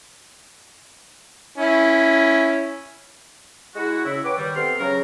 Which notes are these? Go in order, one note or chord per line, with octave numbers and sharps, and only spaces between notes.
C#4 E4
G#3 E4 F#4
C#3 E4
B4 C#5 F#5 G5 D6
G2 D#3 G3
C3 B3 A4 G5 C6 F6
C#3 F#3 A#4